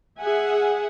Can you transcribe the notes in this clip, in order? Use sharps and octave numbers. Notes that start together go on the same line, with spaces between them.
G#4 E5 F#5 G#5